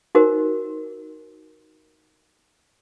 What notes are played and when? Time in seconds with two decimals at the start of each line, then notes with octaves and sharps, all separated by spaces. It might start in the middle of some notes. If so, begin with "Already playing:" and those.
0.15 D#4 F#4 A#4 C5